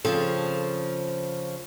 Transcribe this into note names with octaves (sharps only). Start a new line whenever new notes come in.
C#3 F3 C4 A4